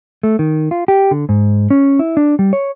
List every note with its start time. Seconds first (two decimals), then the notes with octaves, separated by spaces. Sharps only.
0.23 A3
0.39 D#3
0.71 F4
0.88 G4
1.11 D3
1.29 G#2
1.70 C#4
1.99 E4
2.17 D4
2.39 G3
2.53 C#5